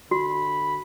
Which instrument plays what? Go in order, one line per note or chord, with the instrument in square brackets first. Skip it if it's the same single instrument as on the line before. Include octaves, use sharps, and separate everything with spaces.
[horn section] D3 B5 [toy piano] F#4